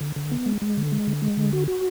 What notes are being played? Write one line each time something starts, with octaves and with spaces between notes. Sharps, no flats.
D3
D3
B3
G#3
G#3
D3
G#3
D3
G#3
D3
F#4
F#4